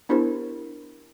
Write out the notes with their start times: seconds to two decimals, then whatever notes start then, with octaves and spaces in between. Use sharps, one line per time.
0.09 B3 D4 E4 G4 A#4 C5